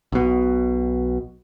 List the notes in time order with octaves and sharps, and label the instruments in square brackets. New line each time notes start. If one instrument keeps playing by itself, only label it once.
[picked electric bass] B1 B2